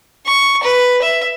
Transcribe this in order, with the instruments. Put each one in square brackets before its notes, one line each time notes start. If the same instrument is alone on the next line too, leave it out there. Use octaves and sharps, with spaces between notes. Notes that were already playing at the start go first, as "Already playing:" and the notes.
[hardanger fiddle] C#6
B4
E5